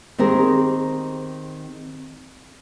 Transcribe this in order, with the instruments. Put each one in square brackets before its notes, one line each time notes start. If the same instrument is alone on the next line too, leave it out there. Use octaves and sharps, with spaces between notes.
[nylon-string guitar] D#3 C4 G4 G#4 A#4